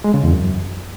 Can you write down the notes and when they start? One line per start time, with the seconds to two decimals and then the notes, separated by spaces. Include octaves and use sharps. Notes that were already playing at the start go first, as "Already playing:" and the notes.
0.04 G#3
0.14 C#3
0.24 E2
0.33 F#2